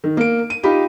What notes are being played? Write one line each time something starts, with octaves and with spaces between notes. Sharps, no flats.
D#3
A#3 D7
D#7
D#4 F4 G4 B5